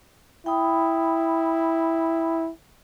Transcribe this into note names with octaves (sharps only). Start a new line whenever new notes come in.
E4 G5 B5 D#6